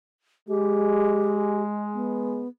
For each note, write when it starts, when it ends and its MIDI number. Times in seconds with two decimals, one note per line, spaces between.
0.49 2.43 56
0.49 1.62 67
1.94 2.48 59